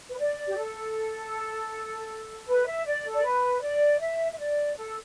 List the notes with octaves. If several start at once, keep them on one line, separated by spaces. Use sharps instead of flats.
B4
D5
G4
A4
B4
E5
D5
A4
D5
B4
D5
E5
E5
D5
A4